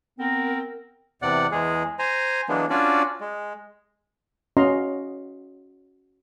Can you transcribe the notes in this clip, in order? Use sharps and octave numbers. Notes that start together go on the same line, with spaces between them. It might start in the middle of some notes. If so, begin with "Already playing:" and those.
B3 C4 A#4
E2 C3 D5 F#5
E2 G#3 G#4
C5 G#5 A#5
E3 F#3 G#3 A#3 B3 D4
C#4 D4 F4 F#4 D5
G#3
C#4 F#4 D#5 F5 A#5 C6